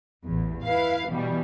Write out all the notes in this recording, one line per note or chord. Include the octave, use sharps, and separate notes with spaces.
A1 E2
E4 B4 F5
B2 E3 G3